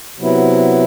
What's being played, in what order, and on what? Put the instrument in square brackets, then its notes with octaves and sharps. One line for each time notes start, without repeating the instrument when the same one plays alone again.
[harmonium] C3 F#3 B3 E4